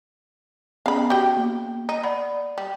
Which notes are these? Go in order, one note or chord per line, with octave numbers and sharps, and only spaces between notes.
B3 C#4 G#4 F5 B5
F#4 G4 G5
A#3
D#4
D5 F#5 B5
G3